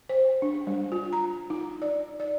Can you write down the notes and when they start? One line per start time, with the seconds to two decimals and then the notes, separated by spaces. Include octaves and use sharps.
0.09 C5
0.42 D4
0.67 G3
0.92 F4
1.13 A#5
1.50 D#4
1.82 D5
2.20 D5